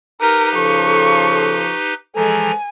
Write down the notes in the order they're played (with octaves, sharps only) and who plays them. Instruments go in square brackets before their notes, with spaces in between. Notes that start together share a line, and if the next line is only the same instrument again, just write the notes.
[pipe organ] D#4 G4 B4 [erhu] A#4
[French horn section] C#3 F3 A4 [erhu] C#6
[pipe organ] E3 F3 A#5 [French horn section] G#3 A4 [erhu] G#5